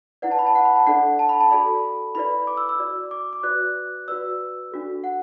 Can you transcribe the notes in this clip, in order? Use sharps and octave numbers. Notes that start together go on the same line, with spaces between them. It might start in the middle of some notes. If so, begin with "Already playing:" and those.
E4 B4 D5 F#5
A5
B5
A5
F#5
B5
A5
D4 A4 D5 F#5
A5
B5
A5
F#4 A4 D5 B5
E4 B4 D5 B5
D6
E6
E6
F#4 D5
D6
D6
F#4 B4 D5 F#6
F#4 B4 D5 E6
D4 F#4 A4
F#5